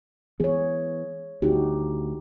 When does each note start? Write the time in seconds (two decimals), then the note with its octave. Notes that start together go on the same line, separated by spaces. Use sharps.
0.40 E3 B3 G#4 C#5
1.42 D2 D#4 F#4 G4